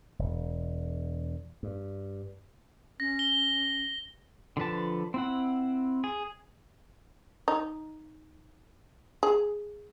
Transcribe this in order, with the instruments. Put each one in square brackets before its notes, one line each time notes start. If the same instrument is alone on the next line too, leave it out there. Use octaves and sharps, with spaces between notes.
[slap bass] E1
G2
[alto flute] C#4 [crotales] A#6
[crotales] G7
[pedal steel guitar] D3 F3 B4 A5
C4 E4 F#5
G#4
[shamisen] D#4
G#4